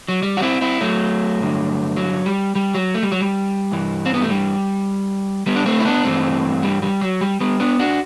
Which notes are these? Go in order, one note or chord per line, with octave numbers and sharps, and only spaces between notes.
F#3
G3
F#4
C4 E4
C4 E4
F#3 A3
G2 D3
F#3
G3
G3
F#3
A3
G3
F#3
G3
G2 E3
C4
B3
A3
G3
G3 B3
D4
A3 C4
E4
B3 D4
G2 E3 A3 C4
G3
G3
F#3
G3
G3 B3
B3 D4
D4 F#4